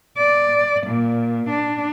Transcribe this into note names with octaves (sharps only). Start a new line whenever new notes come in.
D5
A#2
D4